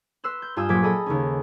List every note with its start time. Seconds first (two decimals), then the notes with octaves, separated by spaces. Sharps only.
0.24 B4 C6 E6 F#6
0.42 G6
0.56 G2 F4 G#5 D#6 E6 G6
0.69 A#1 A#2 F#3 D6 G#6 B6
0.83 G#4 A4 D#5 B5 D#6
1.06 D#2 C#3 C#4